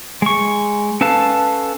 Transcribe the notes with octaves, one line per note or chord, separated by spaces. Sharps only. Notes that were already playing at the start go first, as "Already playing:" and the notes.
G#3 C#6
C#4 A4 B4 F5 A5